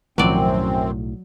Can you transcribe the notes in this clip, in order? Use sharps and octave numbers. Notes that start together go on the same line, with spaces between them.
B1 F#2 A2 D#3 F3 F#3 C4 D5